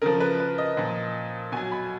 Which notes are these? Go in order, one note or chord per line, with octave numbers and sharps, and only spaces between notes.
C#3 F3 A#4
B4
B4
D#5
A#2 F3
B2 F#3 G#5
B5